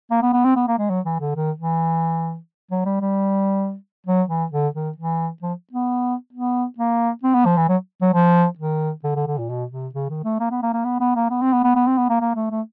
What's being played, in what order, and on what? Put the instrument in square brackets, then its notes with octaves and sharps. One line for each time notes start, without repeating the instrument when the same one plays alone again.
[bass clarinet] A#3
B3
B3
C4
B3
A#3
G#3
F#3
E3
D3
D#3
E3
F#3
G3
G3
F#3
E3
D3
D#3
E3
F3
B3
B3
A#3
C4
B3
F3
E3
F#3
F#3
F3
D#3
D3
D3
D3
A#2
B2
C3
C#3
D#3
A3
A#3
B3
A#3
A#3
B3
B3
A#3
B3
C4
B3
B3
B3
C4
B3
A#3
A#3
A3
A3